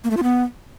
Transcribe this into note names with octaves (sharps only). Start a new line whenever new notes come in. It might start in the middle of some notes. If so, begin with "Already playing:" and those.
A#3
A3
F4
B3